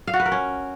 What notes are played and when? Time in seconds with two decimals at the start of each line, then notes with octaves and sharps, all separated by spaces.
0.07 F5
0.14 F#4
0.20 B4
0.26 A#4
0.32 C#4